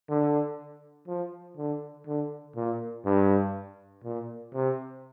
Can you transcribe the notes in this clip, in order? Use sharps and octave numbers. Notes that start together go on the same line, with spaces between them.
D3
F3
D3
D3
A#2
G2
A#2
C3